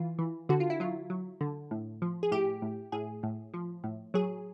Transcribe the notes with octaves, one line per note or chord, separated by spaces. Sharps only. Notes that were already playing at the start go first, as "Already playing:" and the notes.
Already playing: E3 F4
E3
D3 F#4
F4
E4
F#3 F4
F#3
D3
A2
F3
G#4
A2 G4
A2
A2 G#4
A2
F3
A2
F#3 G#4